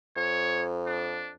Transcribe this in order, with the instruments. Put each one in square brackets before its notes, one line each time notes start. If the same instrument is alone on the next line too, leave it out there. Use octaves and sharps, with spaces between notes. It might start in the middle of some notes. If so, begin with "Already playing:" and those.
[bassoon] F2 [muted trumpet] C#5
[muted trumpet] D4